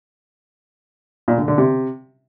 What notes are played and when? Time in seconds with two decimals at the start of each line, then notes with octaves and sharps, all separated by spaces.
1.28 A#2
1.38 D3
1.48 D3
1.58 C3